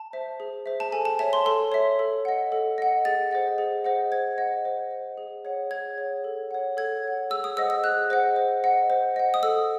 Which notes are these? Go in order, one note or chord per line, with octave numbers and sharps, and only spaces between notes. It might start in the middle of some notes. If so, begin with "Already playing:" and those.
Already playing: A5
C5 E5
G#4
C5 E5
A5
A4 G#5
A5
C#5 E5 A5
C6
A4 C6
C#5 E5
A4
D#5 F#5
A4
D#5 F#5
G#4 A6
C5 D#5 F#5
G#4
C5 D#5 F#5
C5 G#6
D#5 F#5
C5
D#5 F#5
G#4
C#5 F#5
G#4 G#6
C#5 F#5
A4
C#5 F#5
A4 G#6
C#5 F#5
G#4 E6
D#6
C5 D#5 F#5 E6
E6
G#4 F#6
C5 D#5 F#5
C5
D#5 F#5
C5
D#5 F#5
D#6
A4 E6